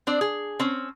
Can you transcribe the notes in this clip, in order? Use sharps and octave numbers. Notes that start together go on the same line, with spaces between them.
C4 D4 D5
G#4
C4 C#4